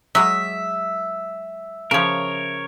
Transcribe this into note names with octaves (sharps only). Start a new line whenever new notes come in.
F#3 G#3 E5
C#3 F3 A#4 C#5